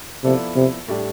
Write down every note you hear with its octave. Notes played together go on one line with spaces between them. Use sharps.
C3 F3 B3 E4 A4 D5
C3
A2 G3 D4 G4 D5